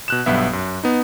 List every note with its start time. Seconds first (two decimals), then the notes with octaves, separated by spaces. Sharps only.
0.08 B2 F#6 E7
0.26 B1 G2 B3 E5
0.53 F#2
0.84 B3 D#4